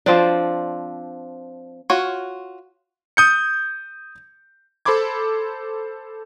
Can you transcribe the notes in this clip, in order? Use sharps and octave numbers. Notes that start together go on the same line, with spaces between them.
F3 C4 D4
F4 F#4 C#5
D#6 G6 C#7
A4 C5 B5 C6 D6 G#6